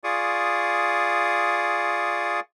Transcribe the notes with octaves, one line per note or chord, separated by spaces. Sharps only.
F4 G#4 D5 C#6 D#6